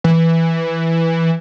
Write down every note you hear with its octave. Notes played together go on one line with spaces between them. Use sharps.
E3